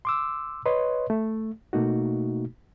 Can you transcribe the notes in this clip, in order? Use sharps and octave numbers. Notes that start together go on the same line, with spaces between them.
C6 D6 E6
B4 C#5 D#5 C6
A3
B2 A3 A#3 D#4 F#4